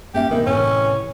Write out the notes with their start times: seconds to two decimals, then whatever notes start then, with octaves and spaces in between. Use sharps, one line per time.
0.14 A#3 C#4 G4 E5
0.30 B2 D#3 A#3 C4
0.46 A2 C3 E3 C#4